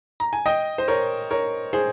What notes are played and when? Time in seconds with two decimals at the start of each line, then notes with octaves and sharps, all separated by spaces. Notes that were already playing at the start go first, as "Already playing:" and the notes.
0.20 A#5
0.33 G#5
0.46 D#5 G5
0.78 C5
0.88 A#4 C#5
1.30 A#4 C#5
1.73 G#4 C5